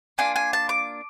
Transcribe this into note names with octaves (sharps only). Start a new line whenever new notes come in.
A#3 D4 F4 G#5
G#5
A5
D6